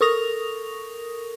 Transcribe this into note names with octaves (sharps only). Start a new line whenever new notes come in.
A4 A#4 C#6 D#6 A#6 F7